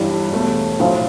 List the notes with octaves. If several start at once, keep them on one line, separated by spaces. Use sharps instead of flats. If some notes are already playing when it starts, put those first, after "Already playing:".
Already playing: G1 G2 E3 G3 A4
E2 B2 A3
B1 A2 F3 F4